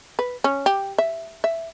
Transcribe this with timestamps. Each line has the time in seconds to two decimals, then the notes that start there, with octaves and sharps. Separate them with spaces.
0.19 B4
0.44 C#4
0.66 G4
0.98 E5
1.44 E5